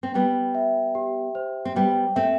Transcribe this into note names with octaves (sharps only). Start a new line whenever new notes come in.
C4
G3 B3 G5
E5
G4
C5
C4
G3 B3 G5
A3 C4 E5